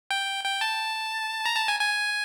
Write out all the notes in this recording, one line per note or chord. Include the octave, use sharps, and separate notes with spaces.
G5
G5
A5
A#5
A5
G#5
G#5